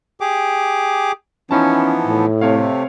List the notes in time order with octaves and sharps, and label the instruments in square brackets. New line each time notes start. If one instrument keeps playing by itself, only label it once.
[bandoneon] G4 G#4 D6
[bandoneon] E3 F3 B3 [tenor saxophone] C#4 [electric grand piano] D#4 E4 A5
[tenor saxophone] A2
[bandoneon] C3 A3 [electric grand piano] C4 C#5 F5